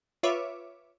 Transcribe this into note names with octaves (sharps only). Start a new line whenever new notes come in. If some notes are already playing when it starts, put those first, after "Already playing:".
F4 B4 C#5 E5 D6